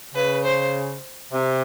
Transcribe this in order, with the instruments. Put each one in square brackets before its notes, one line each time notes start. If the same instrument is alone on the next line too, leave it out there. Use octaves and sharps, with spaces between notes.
[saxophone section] C#3 [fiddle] B4
[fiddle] C5
[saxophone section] C3